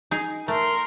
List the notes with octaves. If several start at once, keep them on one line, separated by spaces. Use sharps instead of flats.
D#4 G#4
A3 A#4 C6